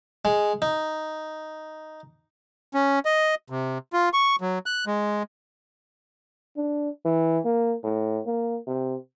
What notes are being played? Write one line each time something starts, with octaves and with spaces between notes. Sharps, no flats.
G#3
D#4
C#4
D#5
C3
F4
C#6
F#3
F#6
G#3
D4
E3
A#3
A2
A#3
C3